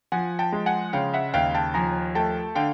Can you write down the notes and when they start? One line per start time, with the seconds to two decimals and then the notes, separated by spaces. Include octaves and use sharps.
0.12 F3 F#5 G#5
0.39 G5 A5
0.52 G#3
0.66 F#5 G#5
0.93 C#3 F5 G5
1.14 E5 F#5
1.34 D#2 F5 G5
1.54 G5 A5
1.74 F3 G#5 A#5
2.15 A3 G5 A5
2.55 D3 F5 G5